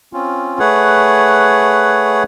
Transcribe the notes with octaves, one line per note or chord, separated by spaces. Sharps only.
C4 C#4 F4
A3 G#4 B4 C#5 F#5